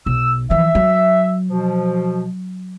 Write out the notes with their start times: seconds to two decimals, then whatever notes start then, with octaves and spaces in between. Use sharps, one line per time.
0.06 B1 E6
0.50 E3 F3 E5
0.75 F#3
1.50 B2 F3